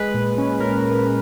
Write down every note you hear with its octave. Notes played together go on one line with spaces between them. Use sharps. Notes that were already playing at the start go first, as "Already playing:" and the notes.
Already playing: G#3 B4
A#2
C#4
A#2 A#4